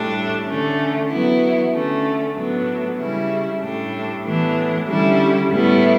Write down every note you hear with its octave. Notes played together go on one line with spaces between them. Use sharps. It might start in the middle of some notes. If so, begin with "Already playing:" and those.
Already playing: A2 G3 D4
D3 A3 C#4
F#3 B3 E4
D3 A3 C#4
A2 F#3 B3 D4
C#3 G3 C#4 E4
A2 G3 D4
A2 E3 B3 D4
D3 G3 C#4 E4
A2 G3 B3 E4